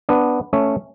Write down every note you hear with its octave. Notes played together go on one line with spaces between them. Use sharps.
B3 D4
A3 C#4